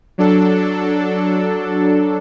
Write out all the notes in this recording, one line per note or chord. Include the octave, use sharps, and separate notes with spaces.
F#3 D4 A4